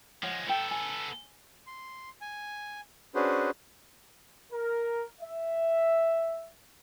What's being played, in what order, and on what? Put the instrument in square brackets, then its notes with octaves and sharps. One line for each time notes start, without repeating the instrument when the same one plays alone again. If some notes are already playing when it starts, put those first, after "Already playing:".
[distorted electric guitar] F3 G#3 [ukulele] C#5 F5 F#5
[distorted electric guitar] B3 A4 [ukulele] B4 G5
[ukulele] G#5
[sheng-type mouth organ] C6
G#5
C#4 D4 F#4 G#4 B4 C5
[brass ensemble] A#4
E5